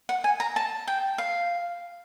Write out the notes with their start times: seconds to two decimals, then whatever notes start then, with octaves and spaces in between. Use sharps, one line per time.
0.09 F#5
0.24 G#5
0.40 A#5
0.56 A5
0.87 G5
1.18 F5